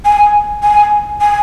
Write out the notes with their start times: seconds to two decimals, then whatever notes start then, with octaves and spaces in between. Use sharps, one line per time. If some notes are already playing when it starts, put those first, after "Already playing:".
0.05 G#5
0.63 G#5
1.21 G#5